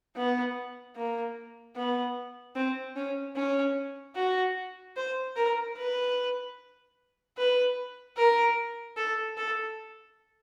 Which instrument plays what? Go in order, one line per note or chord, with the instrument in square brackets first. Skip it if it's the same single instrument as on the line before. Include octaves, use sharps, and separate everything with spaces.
[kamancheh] B3
A#3
B3
C4
C#4
C#4
F#4
C5
A#4
B4
B4
A#4
A4
A4